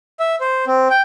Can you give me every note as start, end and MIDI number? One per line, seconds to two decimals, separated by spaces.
0.20 0.36 76
0.41 0.65 72
0.67 0.88 60
0.91 1.02 79